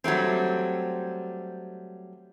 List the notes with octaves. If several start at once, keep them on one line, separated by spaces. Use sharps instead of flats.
F#3 G3 A3 C4